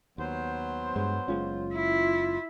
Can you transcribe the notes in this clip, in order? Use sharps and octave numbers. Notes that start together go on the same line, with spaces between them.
D#2 F#3 B3 C5
G2 G#3
F#1 G#3 C#4 F4
E4